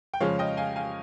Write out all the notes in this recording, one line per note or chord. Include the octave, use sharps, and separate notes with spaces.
G5
F2 C#3 F3 G#3 C#4 C#5 F5
D#5 G5
F5 G#5
F5 G#5